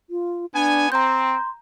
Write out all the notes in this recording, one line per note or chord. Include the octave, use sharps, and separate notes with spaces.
F4
B3 D4 G#5
C4 A#5 C6 G6